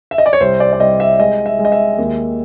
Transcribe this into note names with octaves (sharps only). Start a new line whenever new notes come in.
E5
D#5
D5
C#5
C2 C5
D5
D5
C2 D#5
E5
G#3 D#5
E5
G#3
D#5
E5
D#2